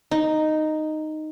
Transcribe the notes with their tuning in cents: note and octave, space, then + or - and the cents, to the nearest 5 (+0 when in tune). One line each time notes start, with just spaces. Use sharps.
D#4 -5